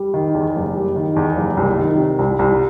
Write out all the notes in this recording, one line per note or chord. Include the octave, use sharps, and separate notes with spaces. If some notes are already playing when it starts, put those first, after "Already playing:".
Already playing: G3
D#3
E2
F#1
G3
D#3
E2
F#1
C2
D#3
C3
C2
C2